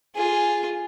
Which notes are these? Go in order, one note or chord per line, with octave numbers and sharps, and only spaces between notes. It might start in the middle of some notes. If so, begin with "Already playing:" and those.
F4 G#4